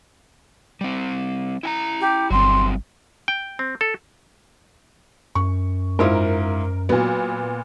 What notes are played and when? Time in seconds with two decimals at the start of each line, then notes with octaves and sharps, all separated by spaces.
0.81 G3 C4
1.63 E4 G#5 A#5
2.00 G4
2.30 G1 F#3 G3 C4 C6
3.28 G5
3.59 C4
3.81 A4
5.35 F#2 C#6
5.99 G#2 E4 F4 A#4
6.89 A#2 F#3 B3